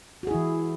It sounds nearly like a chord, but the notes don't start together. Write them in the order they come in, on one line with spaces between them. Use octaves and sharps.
F#4 G#4 E4 E3